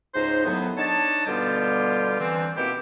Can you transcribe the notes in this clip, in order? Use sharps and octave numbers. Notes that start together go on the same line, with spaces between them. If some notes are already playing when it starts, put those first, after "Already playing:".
C#2 G#2 D#4 C5
D#2 A2 F#3 B3
D4 D#4 C#5 D#5 A5
B2 D3 G3 B3 F4 G4
D3 E3 C4
B2 D#3 A#3 C4 E4 G4